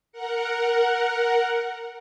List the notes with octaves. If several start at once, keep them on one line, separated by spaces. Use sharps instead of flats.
A#4 F#5